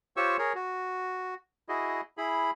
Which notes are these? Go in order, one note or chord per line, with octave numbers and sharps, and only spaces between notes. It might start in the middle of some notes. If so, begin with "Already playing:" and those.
F4 G4 C5 C#5 C#6 E6
G#4 A#4 C#5
F#4
E4 F#4 G#4 D#5
E4 G#4 B5